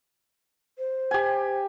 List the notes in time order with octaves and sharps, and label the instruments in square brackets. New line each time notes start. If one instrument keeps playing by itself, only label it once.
[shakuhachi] C5
[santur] G4 G#5